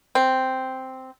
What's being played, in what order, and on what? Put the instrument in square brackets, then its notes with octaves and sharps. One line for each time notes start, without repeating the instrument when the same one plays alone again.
[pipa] C4